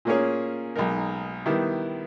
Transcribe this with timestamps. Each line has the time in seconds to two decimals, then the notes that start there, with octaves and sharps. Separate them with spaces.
0.05 A#2 A#3 C#4 G#4 C#5
0.76 B1 B2 G#3 D#4 A#4
1.46 D#3 G3 B3 E4